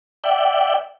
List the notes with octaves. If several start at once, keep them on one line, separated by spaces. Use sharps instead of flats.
D5 E5 F#5 G5